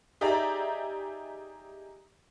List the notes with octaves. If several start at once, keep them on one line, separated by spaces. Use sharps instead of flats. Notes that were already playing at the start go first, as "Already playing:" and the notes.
D#4 G4 G#4 D5 E5 A#5